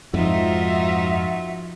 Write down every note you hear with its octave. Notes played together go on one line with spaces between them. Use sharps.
F2 G#2 F3 D#4 F4 F#4 E5